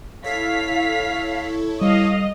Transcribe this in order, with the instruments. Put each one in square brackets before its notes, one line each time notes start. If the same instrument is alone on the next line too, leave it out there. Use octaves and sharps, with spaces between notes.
[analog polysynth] E4 A4 C#5 [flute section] F5 [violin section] B6
[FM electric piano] G3 [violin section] D#5 [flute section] F5